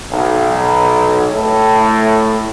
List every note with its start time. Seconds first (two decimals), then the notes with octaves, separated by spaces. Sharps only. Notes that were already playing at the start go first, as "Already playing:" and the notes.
0.12 B1
1.33 A2